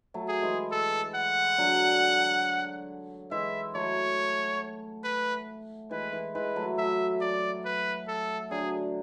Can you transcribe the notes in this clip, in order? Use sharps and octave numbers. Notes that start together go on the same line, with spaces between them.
F#3 A3
G#4
E3 G#3
A4
F#5
D3 F#3
E3 G#3 E5
F#3 A3 C#5
B4
E3 G#3 B4
E3
E3 G#3 B4
F#3 A3
F#3 A3 E5
D5
B4
A4
D3 F#3 G#4